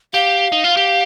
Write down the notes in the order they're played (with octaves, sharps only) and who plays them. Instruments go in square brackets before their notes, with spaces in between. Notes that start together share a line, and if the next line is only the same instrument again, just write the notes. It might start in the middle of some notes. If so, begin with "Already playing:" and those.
[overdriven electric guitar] G4 [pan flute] F5
[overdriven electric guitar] D#4
F4
G4